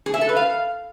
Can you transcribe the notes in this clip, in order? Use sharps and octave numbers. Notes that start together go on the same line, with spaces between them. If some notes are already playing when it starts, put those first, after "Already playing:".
G#4
E5
A4
B4
F5